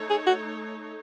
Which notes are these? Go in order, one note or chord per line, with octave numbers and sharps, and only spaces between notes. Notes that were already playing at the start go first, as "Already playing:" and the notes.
Already playing: A3 D#4 A4 C#5
G#4
F#4